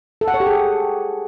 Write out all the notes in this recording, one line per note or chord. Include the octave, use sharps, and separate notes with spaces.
A4
F#5
C#5
G4
G#4